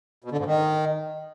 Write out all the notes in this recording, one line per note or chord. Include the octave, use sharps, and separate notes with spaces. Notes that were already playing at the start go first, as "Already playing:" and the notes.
B2
D3
G#2
D#3